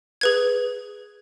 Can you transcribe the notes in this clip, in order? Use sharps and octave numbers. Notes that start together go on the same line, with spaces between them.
G#4 B4 G#6